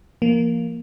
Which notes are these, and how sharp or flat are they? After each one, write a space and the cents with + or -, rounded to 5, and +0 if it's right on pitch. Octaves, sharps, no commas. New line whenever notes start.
F3 -35 A#3 +0